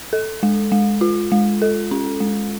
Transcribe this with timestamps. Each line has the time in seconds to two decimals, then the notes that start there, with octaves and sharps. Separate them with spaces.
0.13 A4
0.43 G#3
0.72 G#3
1.01 F4
1.32 G#3
1.62 A4
1.91 C#4
2.20 G#3